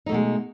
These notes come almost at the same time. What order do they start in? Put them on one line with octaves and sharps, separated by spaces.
D#4 A3 B2 G#3